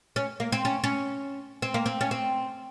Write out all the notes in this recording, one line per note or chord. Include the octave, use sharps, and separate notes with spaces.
C#4
A#3
C4
C#4
C#4
C4
A#3
C4
C#4
C4